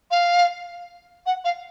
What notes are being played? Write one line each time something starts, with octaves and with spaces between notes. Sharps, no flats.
F5
F#5
F5